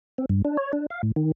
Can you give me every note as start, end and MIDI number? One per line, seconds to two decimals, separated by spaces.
0.18 0.25 60
0.29 0.42 43
0.45 0.57 62
0.57 0.72 73
0.73 0.86 62
0.90 1.02 77
1.03 1.12 45
1.16 1.32 51